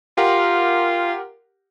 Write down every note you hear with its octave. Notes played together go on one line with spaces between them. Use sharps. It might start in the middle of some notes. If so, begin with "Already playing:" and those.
F4 G4 A#4 F#5